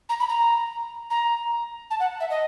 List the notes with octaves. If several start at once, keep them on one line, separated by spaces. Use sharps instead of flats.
A#5
B5
A#5
A#5
A5
F#5
E5
D#5